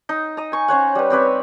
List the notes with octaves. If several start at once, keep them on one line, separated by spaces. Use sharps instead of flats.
D#4
D#5 A#5
G#5 C#6
C#4 C5 C#5 F#5
G3 B4
C4 G4 B4 C#5